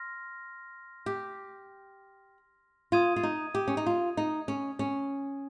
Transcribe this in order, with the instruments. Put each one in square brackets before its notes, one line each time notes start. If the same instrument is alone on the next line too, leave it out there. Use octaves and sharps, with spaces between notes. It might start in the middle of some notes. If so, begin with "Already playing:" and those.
Already playing: [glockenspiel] C6 F6 A#6
[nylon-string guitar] G4
[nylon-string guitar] F4 [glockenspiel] D#6 G#6 D#7
[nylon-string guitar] F4
D#4
G4
C#4
D#4
F4
D#4
C#4
C#4